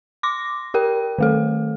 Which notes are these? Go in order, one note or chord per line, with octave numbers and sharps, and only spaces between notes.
C6 D6 A#6
G4 A#4 G5
D#3 A3 A4